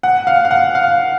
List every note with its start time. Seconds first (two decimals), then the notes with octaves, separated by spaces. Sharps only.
0.03 F#5
0.27 F5
0.45 F5
0.51 F#5
0.75 F5